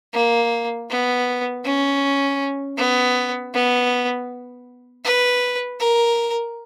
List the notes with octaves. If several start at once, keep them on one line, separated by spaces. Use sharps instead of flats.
A#3
B3
C#4
B3
B3
B4
A#4